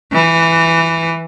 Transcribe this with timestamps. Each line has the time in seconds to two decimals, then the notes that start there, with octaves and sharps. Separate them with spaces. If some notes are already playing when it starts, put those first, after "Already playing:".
0.13 E3